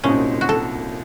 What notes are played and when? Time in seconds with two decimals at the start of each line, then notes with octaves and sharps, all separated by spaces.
0.04 C2 A#2 F#3 C4 C#4 D#4
0.41 F#4
0.49 A4